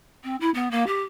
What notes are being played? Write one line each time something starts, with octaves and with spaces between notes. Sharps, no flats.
C4
E4
B3
A#3
G4